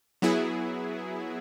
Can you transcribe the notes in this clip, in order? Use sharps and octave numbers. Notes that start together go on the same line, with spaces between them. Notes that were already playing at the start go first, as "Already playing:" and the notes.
F#3 B3 E4 G#4